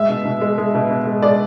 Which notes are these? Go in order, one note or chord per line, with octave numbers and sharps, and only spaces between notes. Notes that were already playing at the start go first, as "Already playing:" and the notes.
Already playing: G#3 E5
B2
B2
G#3
G#3
B2
B2
G#3
G#3 D5